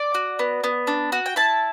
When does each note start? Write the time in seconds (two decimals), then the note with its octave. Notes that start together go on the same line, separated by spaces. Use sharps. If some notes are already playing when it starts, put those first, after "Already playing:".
Already playing: D5
0.15 F#4
0.39 B3
0.64 B3
0.87 D4
1.12 F#4
1.26 G5
1.36 E4 A5